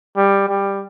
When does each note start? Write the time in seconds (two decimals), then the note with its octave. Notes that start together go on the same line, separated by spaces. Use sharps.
0.17 G3
0.49 G3